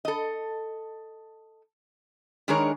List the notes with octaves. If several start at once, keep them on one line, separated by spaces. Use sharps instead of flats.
A4 D#5
D#3 G#3 D4 G#4 A#4 C#5